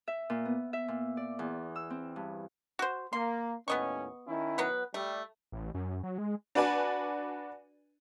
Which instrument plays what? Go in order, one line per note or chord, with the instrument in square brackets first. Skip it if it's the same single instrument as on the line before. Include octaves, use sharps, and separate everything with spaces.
[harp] E5
A#2
B3
E5
A#2
D5
E2
E6
C4
G2
[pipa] F#4 C5
[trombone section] A#3 [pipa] C6
[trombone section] D#2 A2 C#4 [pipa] B3 D#5 C#6
[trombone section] D#3 C#4 E4
[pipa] F#3 B3 B4
[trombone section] G3 [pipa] A3
[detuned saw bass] A1
F#2
F#3
G#3
[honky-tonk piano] D4 F#4 B4 D5 G#5